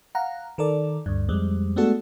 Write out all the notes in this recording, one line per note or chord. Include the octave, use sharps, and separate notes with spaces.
F5 F#5 A#5
D#3 A4 A#4 D5
D2 G2
F2 G3 G#3
G#3 A3 B3 D4 F#4 A4